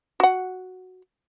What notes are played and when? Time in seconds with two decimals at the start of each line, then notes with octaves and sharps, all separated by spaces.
0.20 F#4 F#5